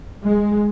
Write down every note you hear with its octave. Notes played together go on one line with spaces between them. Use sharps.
G#3